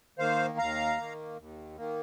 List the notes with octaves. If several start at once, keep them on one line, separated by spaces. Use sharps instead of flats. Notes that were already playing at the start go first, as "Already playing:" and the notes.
D#3 A#3 C5 F5
D#2 F5 A#5
D#3 A#3
D#2
D#3 A#3